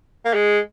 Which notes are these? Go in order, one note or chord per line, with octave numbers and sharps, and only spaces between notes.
A#3
G#3